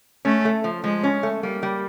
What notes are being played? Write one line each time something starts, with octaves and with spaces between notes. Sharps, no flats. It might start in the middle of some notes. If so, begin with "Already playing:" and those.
A3 C#4
A3
F3
F3 G#3
C#4
A3
G3 A#3
G3